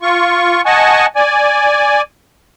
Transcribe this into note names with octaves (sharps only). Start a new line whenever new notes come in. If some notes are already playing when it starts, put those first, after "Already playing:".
F4 C#6
D#5 F#5 G#5 A5 C#6
D5 G#5